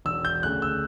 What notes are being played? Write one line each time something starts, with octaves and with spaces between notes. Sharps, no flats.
E1 E6
G6
D2 C#3 F#6
E6